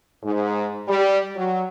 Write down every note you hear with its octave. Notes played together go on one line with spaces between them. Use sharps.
G#2
G3
F#3